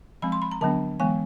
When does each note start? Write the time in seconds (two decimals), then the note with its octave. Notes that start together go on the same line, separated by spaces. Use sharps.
0.22 F3 G#3 C4 B5
0.32 C6
0.42 B5
0.52 A#5
0.61 D3 F#3 B3 D4 A5
1.00 E3 G#3 B3 G#5